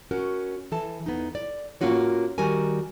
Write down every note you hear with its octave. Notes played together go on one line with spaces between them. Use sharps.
C#4 F#4 A#4
E3 A4 A5
E2 B3 D#4
D5
A2 A#3 C#4 F4 F#4 C#5
D#3 G3 F#4 A#4 G#5